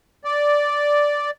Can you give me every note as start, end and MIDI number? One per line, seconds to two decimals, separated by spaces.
0.24 1.30 74